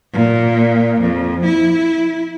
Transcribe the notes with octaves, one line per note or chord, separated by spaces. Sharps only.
A#2
F2
E4